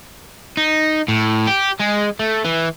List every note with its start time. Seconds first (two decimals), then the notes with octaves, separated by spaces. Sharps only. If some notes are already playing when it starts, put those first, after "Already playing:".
0.57 D#4
1.08 A2
1.47 G4
1.80 G#3
2.20 A3
2.45 E3